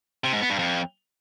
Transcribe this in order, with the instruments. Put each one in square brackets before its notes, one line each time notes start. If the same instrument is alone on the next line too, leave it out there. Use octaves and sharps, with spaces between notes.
[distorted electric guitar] C3
G#2
B3
G2
F2